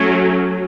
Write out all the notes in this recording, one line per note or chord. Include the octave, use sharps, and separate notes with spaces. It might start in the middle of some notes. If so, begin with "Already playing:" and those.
Already playing: F#3 A3 C#4